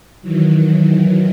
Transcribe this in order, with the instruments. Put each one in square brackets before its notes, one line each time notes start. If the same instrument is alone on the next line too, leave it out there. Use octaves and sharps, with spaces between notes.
[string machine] D#3 E3 F#3